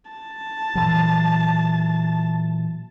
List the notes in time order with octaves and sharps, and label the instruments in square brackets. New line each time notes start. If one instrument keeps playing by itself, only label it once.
[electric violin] A5
[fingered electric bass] A#2 E3 F#3